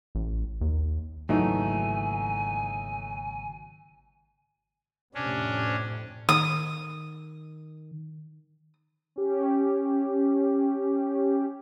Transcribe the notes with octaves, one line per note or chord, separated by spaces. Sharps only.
A1
D#2
G#1 C#3 E3 F#3 A3 A#3 D#4 G#5
F2 A2 C3 C#4 D4
D#3 D#6
C#4 G4